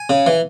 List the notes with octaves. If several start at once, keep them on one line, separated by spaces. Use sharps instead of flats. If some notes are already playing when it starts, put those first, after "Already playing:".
Already playing: G#5
C#3
E3